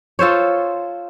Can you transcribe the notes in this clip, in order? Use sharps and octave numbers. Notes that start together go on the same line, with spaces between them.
F4 A4 C5 C#5